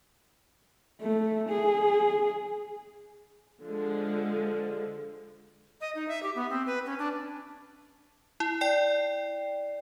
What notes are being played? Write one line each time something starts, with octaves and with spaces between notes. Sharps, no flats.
A3
G#4
D3 F3 G#3
D#5
D#4
E5
G4
B3
C4
B4
C#4
D4
E4
D5 G5 C7